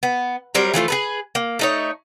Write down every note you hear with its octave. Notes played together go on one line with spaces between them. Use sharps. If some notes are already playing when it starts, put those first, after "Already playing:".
B3
F#3 G3 C4 A#4
E3 F3 A3 F4
G#4 A4 B4
A#3
A3 D#4 C#5